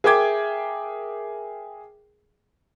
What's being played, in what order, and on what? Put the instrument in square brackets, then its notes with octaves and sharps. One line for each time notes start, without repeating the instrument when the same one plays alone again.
[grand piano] G#4 A#4 E5 G5 D6 G#6